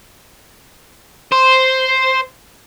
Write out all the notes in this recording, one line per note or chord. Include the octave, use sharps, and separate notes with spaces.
C5